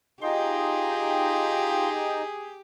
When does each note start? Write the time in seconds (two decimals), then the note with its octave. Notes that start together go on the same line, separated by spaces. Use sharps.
0.22 D#4 F4 G4 G#4 D#5 F5 G5 C6